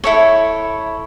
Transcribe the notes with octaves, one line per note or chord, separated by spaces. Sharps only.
E4 A4 C#5